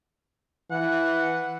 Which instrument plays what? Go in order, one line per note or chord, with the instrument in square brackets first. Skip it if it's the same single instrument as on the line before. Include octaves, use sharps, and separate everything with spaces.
[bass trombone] E3 [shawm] F#5